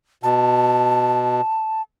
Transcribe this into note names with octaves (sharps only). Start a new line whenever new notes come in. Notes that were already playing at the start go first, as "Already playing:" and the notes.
B2 A5